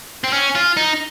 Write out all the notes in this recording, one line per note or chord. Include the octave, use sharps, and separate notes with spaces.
C4
C#4
F4
D#4